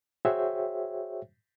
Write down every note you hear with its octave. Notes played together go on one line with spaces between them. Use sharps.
F#4 G#4 C5 C#5 E5 G5